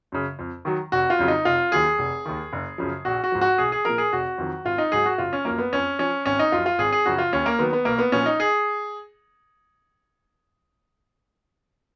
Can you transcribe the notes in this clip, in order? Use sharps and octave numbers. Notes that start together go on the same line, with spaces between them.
F#2 C#3
F2
D#3 F#3
F1 F#4
F4
F2 C#3 F#3
D#4
F1 F4
D#2 D#3 F#3 G#4
F1
D#2 D#3
F#1
F#2 C#3 F3
A#1 F#4
F#4
G#2 F3
F#4
B1 G#4
G#4
A#2 F3 A#4
G#4
F1 F#4
F2 D#3 F#3
G#1 F4
D#4
G#2 F#3 G#4
F#4
F#1 F4
C#4
F#2 F3 A#3
B3
F2 C#4
F3 C#4
G#1 C#4
D#4
F#2 F3 F4
F4
G#1 G#4
G#4
F#2 C#3 F3 F#4
F4
D#2 C#4
A#3
D#3 F#3 B3
B3
B1 A#3
B3
A#2 F3 C#4
D#4
G#4